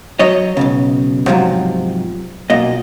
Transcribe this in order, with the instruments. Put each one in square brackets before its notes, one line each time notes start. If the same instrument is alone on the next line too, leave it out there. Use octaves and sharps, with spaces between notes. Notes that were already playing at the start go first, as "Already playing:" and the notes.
[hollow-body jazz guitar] F#3 C#5 D#5
B1 G2 C#3
G#2 C3 F3 F#3
B1 A#2 D#5